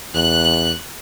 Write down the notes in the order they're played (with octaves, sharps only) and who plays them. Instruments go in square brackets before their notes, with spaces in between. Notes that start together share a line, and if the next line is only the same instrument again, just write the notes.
[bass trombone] E2 [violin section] F#6